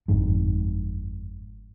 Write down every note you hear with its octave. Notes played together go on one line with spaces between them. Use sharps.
G1 F2 G#2